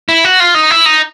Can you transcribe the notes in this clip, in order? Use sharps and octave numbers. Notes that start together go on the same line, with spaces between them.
E4
F#4
F4
D#4
E4
D#4